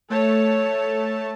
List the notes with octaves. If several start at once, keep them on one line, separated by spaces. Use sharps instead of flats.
A3 A4 C#5 A5